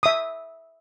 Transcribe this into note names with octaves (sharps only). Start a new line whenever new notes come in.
E5 D#6